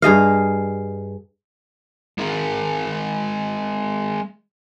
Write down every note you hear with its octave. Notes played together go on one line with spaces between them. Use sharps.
G2 G#4 D#5 F5
G#3 A#4